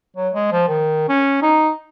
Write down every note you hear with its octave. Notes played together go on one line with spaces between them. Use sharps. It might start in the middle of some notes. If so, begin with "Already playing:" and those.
F#3
G#3
F3
D#3
C#4
D#4